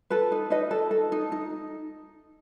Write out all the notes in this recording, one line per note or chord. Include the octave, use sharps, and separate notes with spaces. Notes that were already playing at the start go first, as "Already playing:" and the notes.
A4 B4
D#4
D#4 B4 D#5
A4
A4
D#4
D#4